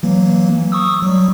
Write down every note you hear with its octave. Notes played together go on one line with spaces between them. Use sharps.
E3 F#3 A#3
C#6 D#6 E6
F#3 G3